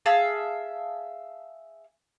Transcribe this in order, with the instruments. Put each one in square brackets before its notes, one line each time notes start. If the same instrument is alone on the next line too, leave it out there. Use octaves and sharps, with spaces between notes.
[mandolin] G#4 E5 F5 A5